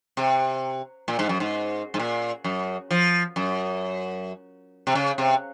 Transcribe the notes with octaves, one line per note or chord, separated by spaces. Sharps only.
C3
A#2
G#2
F#2
G#2
G#2
A#2
F#2
F3
F#2
C3
C#3
C3